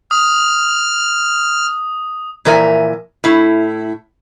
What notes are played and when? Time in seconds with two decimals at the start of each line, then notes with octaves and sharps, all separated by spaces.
0.11 D#6 F6
2.45 A#2 E3 F3 A#4 E5 G#5
3.24 A2 E4